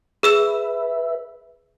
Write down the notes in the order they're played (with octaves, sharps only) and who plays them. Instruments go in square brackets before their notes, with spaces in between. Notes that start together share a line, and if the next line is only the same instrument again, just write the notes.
[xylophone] G#4 E6 E7 [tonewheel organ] B4 E5